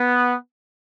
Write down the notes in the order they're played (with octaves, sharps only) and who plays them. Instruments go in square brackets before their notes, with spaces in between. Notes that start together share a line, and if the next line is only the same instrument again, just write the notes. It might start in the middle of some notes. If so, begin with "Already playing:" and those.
Already playing: [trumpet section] B3